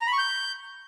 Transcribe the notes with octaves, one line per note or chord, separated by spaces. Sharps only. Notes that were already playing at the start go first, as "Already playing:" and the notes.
A#5
B5
C#6
G6